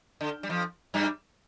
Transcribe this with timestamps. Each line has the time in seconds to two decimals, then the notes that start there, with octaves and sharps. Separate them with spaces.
0.21 D3
0.43 G3
0.49 F2 F3
0.94 G2 G3